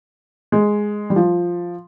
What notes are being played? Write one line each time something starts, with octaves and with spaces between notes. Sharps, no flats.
G#3
G3
F3